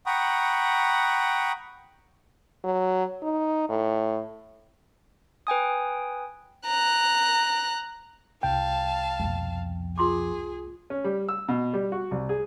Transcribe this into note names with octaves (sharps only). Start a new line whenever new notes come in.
F#5 G5 A#5 B5 C#6 D#6
F#3
D#4
A2
B4 G5 G#5 D#6
A#5 F#6
C2 F5 G5 A5
F2 B2
F4 G#4 C6 D6
C#4
G3
E6
B2
G3
F#4
C2
G#4